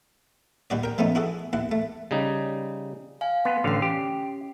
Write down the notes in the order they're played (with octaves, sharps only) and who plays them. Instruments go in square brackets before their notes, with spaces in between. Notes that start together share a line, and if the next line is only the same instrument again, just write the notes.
[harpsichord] D#2 G3 F#4 D5
A#4 G5
F3 A3 B3 C#4 D#4
E4 F#4 G#4 A4
D#2 E4 F#5
A3
[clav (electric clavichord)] C#3 G3 D#4
[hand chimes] F5 G#5
[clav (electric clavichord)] B3 [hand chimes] C6
[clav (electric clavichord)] A1 D3 F5 [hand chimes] C#4 C7
[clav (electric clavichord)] G4